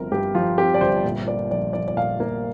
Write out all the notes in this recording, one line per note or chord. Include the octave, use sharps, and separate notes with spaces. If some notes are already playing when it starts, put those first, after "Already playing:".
Already playing: G1 G2 F3 C4 A#4
G2 G4
F3 F4
C4 G4
D5
G1 C5
A#2
A#3 D5
A#1 D5
A#1 D5
D5
A#2 F5
A#3